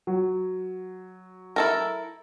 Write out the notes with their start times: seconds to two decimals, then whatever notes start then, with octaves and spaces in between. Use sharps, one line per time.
0.07 F#3
1.56 E4 A4 A#4